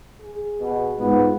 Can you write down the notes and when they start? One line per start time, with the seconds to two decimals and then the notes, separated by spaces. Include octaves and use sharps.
0.21 G#4
0.60 B2
0.99 G#2 B3 F4